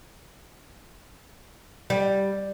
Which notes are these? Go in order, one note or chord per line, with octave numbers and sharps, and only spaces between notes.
G3